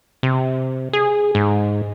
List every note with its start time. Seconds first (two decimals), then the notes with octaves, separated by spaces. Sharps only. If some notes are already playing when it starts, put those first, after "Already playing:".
0.23 C3
0.93 G#4
1.35 G#2